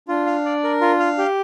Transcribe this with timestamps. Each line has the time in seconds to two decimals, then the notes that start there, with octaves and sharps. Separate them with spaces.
0.08 D4 F4
0.26 F5
0.45 D5
0.64 A#4
0.81 F4
1.00 F5
1.18 G4